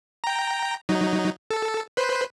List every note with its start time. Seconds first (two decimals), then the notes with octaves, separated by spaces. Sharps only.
0.24 G5 A#5
0.89 F#3 D#4
1.50 A4
1.97 B4 C5